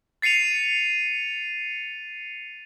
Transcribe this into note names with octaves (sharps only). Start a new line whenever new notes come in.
A6 C7 C#7 D#7 F7